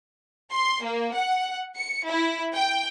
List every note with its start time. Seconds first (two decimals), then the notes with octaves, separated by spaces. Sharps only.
0.53 C6
0.83 A#3
1.15 F#5
1.76 C#7
2.07 E4
2.54 G5